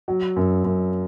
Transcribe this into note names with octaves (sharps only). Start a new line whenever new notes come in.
F#3
F#2
F#2